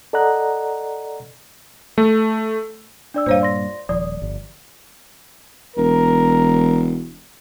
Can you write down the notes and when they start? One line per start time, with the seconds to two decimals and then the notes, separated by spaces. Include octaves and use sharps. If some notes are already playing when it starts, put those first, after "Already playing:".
0.13 A4 D5 D#5 F#5 A#5 F#6
1.98 A3
3.14 D4 D5 E6
3.26 G2 A#2 C5 C#5 F5
3.41 D5 C6 A#6
3.89 D#1 F3 D5
4.22 G1
5.76 E1 A#4